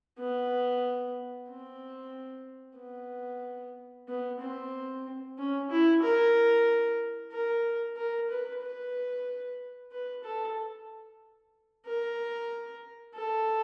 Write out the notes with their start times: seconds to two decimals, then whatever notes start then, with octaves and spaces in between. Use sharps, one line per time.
0.19 B3
1.49 C4
2.78 B3
4.08 B3
4.40 C4
5.38 C#4
5.71 E4
6.03 A#4
7.32 A#4
7.96 A#4
8.30 B4
8.62 B4
9.92 B4
10.24 A4
11.86 A#4
13.15 A4